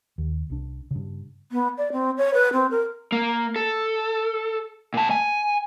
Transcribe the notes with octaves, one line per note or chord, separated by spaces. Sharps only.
D#2
C2 D4
G2 C#3
B3
D5
C4
C#5
B4
C4
A#4
A#3
A4
A#2 A5
G#5